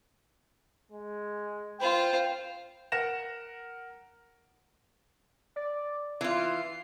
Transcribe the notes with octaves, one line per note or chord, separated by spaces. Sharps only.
G#3
F4 C5 G5
A#4 F#5 A#6 E7
D5
E3 F4 C7